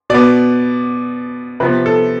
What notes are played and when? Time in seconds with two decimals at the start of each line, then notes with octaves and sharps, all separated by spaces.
0.10 B2 B3 D5
1.60 C3 F3 B3 B4
1.86 A4